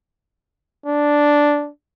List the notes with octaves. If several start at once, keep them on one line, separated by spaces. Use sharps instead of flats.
D4